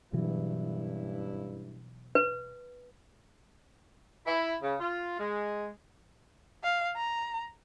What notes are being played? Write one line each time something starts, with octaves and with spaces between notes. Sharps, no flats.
F#1 G2 B2 E3 F#3 E4
B4
E4
C#3
F4
G#3
F5
A#5